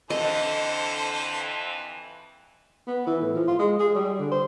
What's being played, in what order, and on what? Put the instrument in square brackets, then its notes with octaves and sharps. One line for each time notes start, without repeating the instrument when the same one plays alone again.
[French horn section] F2 E3 [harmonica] D3 A4 C5 [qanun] D#5
[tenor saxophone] B3
E3
A2
F3
F4
G#3
G#4
G3
D3
C5